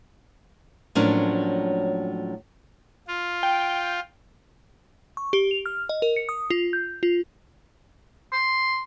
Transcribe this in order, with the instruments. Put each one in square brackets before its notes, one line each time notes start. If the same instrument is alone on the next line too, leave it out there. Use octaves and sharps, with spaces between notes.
[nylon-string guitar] A2 F3 F#3 A#3 C#4 D4
[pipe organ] F4
[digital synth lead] G5
[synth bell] C#6
G4
F7
F6
D#5
A#4
C#7
D#6
F4
G6
F4
[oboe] C6